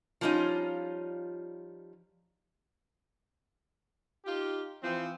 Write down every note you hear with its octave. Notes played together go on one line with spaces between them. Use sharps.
F3 G3 C#4 D#4 F4
D#4 F4 G4
E3 F3 C4